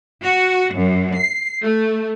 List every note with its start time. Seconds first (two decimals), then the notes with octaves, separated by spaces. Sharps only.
0.21 F#4
0.74 F#2
1.14 C7
1.62 A3